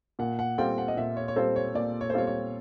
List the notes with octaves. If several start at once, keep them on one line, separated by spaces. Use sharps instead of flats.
A#2 F#5
F#5
G3 C4 F4 A4 G5
F#5
D#5
A#2 E5
C#5
C#5
G3 C4 F4 A4 C5
C#5
A#2 D5
C#5
C5
G3 C4 F4 A4 C#5
C#5